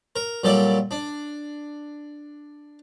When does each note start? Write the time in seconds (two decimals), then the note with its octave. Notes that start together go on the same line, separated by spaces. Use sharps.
0.16 A#4
0.44 A#2 F#3 G3 A4 D5
0.91 D4